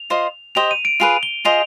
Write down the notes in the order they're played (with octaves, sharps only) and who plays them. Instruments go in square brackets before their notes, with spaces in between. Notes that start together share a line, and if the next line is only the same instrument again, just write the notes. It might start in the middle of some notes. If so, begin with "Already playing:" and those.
Already playing: [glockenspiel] F7
[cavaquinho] F4 C5 D#5
[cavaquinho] G4 C5 D#5 [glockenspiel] F7
[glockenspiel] D#7
D7
[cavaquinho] F4 G#4 B4 [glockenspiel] F7
[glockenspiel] G7
[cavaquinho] F4 G#4 C5 D#5 [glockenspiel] F7